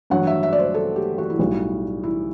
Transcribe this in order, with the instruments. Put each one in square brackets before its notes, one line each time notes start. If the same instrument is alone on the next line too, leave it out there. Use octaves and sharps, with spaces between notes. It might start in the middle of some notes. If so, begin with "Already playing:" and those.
[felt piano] A1 G2 F#3 F#5
E5
E5
D5
C5
A4
G4
F#4
E4
B1 A2 G3 F#4
E4